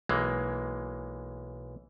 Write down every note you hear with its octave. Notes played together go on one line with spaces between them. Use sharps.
B1 E3 G#3 A#3